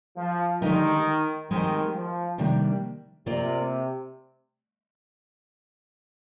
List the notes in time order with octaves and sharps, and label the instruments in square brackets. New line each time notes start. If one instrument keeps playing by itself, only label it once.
[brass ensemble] F3
[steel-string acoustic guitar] D3 G#3 D#4 G4 A#4 [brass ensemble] D#3
[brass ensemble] D#3 [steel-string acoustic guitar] G#3 C4 G4 C5
[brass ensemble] F3
[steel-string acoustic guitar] C3 D#3 G3 A#3 D4
[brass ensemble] C3 [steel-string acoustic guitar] A#3 F4 A#4 D5